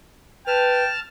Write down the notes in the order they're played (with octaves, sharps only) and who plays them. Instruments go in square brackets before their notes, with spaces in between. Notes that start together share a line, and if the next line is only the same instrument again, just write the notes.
[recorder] B4 [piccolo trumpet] G5 [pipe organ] A5 F6